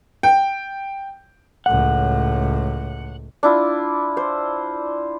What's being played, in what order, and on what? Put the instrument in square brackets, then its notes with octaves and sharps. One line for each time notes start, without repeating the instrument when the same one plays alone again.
[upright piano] G5
[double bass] C#2 A2 [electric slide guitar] F#5
[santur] D4 E4 F4
C5